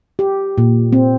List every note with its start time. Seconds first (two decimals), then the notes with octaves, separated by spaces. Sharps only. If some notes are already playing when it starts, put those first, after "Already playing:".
0.19 G4
0.58 A#2
0.93 C4